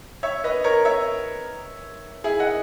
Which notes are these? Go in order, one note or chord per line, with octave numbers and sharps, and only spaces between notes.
C#5 E5
B4 D#5
A#4 C#5
C#5 E5
E4 G#4
D#5 F#5